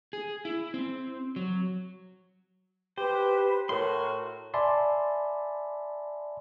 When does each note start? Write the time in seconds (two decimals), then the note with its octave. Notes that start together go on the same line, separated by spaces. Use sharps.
0.13 G#4
0.45 E4
0.74 C4
1.36 F#3
2.98 G4 B4 C5
3.69 A2 F#4 A#4 C6
4.54 D5 E5 G#5 A5 B5 C6